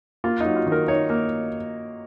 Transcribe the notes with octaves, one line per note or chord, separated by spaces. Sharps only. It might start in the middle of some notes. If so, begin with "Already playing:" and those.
A#3 F4
F#3 D#4
F4
D#3
A#4
D#4 C#5
A#3